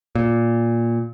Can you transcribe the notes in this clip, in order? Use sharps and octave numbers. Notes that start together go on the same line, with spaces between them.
A#2